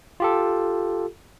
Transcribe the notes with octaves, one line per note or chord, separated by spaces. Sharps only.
F4 G4 A4